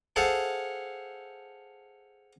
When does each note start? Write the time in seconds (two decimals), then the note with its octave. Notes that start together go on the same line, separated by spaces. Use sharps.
0.16 G#4 A4 C5 F5 F#5 A5